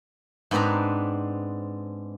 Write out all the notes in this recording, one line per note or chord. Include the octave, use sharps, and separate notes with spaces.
G#2 B3 C4 D4 B4 A#5